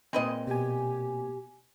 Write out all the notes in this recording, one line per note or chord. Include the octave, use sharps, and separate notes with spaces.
A#2 G#3 C4 B4 D#5
B2 G4 G#5